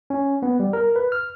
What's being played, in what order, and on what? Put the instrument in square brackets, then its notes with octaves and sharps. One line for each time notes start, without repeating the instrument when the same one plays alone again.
[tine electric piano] C#4
B3
G3
A#4
B4
F6